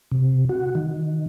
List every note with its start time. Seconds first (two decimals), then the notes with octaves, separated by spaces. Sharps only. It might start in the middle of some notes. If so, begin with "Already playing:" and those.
0.11 C3
0.49 F#4
0.75 D#3